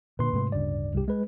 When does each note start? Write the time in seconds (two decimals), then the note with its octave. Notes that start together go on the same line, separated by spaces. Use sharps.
0.19 A#2 D3 A#3 B4 C6
0.33 G#2 C3 A3
0.52 D1 G2 C#3 D5
0.94 C2 G4
1.08 G#3 B4